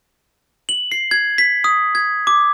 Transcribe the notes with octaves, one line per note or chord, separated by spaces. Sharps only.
F#7
C7
G#6
B6
D#6
G#6
D6